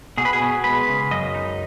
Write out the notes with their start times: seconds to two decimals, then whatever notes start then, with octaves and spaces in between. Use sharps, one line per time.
0.17 B2 G#4
0.25 B4
0.33 G#4
0.42 B2
0.64 G#3 B4
0.88 C#3
1.11 F#2 D#5
1.34 D#4